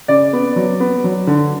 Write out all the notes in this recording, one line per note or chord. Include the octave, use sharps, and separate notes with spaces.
C#3 D5
B3
F#3
B3
F#3
D3